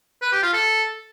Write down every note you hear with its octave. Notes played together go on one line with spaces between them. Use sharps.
B4
G4
F4
A4